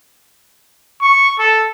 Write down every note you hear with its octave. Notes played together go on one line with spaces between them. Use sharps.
C#6
A4